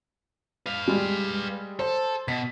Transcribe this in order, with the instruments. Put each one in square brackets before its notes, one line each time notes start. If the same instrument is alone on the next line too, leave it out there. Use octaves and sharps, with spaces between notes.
[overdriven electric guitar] B4 F5
[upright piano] G3 G#3
[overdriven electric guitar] A4 [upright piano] C5
[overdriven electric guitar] B2 [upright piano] B6